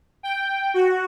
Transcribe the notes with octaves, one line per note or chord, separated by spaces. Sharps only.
G5
F#4